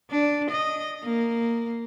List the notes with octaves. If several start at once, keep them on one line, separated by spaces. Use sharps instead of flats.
D4
D#5
A#3